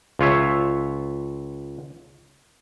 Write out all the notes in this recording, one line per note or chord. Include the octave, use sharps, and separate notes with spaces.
C#2 F4 C#5 E5